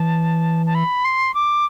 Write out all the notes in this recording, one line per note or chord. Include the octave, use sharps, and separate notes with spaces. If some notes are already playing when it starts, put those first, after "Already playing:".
Already playing: E3 A5
A5
B5
C6
D6